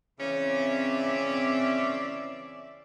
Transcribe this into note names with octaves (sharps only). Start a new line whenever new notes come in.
C#3 E3 C4 C#4 D5 E5